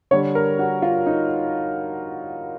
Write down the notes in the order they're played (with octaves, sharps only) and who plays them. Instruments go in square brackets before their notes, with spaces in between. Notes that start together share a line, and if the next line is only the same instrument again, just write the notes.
[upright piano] D3 G3 C#5
A#4
F#4
F4
D#4